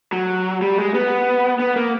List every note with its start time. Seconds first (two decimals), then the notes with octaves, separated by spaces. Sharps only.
0.13 F#3
0.62 G3
0.78 G#3
0.94 B3
1.60 B3
1.76 A#3